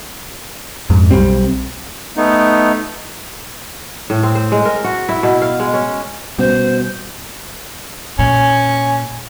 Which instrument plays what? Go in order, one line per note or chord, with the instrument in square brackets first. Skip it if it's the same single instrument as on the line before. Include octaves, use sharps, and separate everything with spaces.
[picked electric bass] F2 G#2
B1 G3 C4
[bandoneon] A3 B3 D#4
[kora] A2
C4
C5
G#3
A#4
F#4
E4
B2
F5
G#3
C#4
[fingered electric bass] B2 [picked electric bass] G3 C4 C#4 [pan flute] C5
[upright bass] A#2 [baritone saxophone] C#4